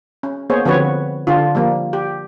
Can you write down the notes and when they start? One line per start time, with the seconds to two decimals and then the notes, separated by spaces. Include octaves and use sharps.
0.23 C#4
0.50 A#3 B3 G#4 C5 C#5
0.65 D3 F3 C4 F#4 B4 C#5
1.27 D3 D4 F4
1.55 F3 G3 A#3
1.93 G4